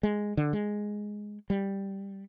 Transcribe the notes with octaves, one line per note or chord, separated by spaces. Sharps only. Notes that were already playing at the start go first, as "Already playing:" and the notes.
G#3
D3
G#3
G3